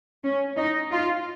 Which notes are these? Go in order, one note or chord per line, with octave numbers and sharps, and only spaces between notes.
C#4
D#4
F4